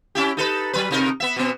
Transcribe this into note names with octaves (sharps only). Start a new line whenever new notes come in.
C#4 E4 G4
D#4 A4 B4
F#3 B4
C3 D#4 A#4
B3 E5
B2 B3